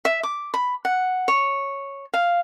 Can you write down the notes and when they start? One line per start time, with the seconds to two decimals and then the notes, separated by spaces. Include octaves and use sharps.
0.05 E5
0.23 D6
0.54 B5
0.85 F#5
1.28 C#5
2.14 F5